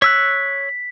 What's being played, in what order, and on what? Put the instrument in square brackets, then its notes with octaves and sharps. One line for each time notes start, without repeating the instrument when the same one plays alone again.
[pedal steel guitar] C#5 E6 F#6 [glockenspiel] B6